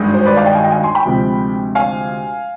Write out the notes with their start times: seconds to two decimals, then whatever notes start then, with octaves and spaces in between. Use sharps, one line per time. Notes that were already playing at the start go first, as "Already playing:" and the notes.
Already playing: G#1 G2 D#3 G#3
0.14 C5
0.26 B4 D5
0.37 D5 F5
0.45 D#5 G5
0.54 F5 G#5
0.63 D#5 G5
0.71 F5 G#5
0.83 G#5 C6
0.95 G5 B5
1.06 D2 C3 F3 G#3
1.75 F5 G#5